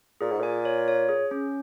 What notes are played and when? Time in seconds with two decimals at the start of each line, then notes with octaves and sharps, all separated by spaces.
0.21 A#2 G#4
0.31 G#2
0.40 A#2 G#5
0.65 C#5
0.88 C#5
1.09 G#4
1.31 C#4